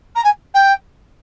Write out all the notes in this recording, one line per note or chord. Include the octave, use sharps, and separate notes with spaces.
A#5
G#5
G5